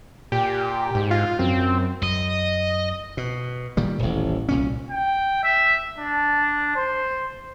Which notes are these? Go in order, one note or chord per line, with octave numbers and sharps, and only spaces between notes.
A#2 G4
G#2
F4
F#2 C4
F#2 D#5
B2
A#2 D#3 G3
D#1 A1
C2 A#2 C#4
G5
E5
D4
C5